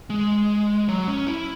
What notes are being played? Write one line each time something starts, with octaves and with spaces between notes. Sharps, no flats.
G#3
F#3
C#4
E4